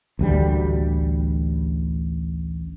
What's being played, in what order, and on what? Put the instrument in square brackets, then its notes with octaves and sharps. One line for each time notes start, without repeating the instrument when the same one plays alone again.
[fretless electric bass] A1 D2 G3